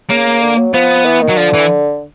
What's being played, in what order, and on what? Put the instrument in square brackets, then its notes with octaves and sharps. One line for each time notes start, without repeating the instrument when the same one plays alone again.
[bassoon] C#3 [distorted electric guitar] A#3
[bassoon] D3
F#3
[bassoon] F3 [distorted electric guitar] B3
[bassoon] E3
D#3
[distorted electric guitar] F#3
[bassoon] D3 [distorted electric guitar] F3
[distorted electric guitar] E3